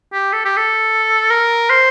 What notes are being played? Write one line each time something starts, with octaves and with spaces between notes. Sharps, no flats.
G4
A4
G4
A4
A#4
C5